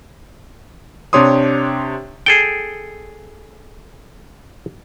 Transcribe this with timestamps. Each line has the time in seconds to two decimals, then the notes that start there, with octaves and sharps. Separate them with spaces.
1.13 C3 D4 G4 C#5 C6 D#6
2.26 G#4 A4 G5